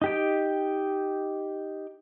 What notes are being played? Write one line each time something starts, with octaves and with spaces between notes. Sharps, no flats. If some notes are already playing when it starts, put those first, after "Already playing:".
D#4 G4 G5